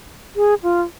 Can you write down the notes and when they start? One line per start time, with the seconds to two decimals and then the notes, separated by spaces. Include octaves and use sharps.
0.36 G#4
0.63 F4